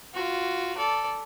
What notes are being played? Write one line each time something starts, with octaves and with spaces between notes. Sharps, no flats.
F4 F#4
A4 D5